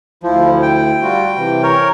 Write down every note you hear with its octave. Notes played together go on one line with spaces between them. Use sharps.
D2 F3 E4
G5
G3 F4 F#4
C3 E3
A#4 C#5